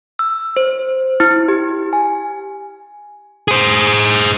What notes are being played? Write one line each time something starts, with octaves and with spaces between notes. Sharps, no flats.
E6
C5
E4
G4
G#5
G#4 C5